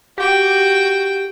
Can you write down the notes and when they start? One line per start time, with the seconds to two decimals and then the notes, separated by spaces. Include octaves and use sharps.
0.18 F#4 G4 G5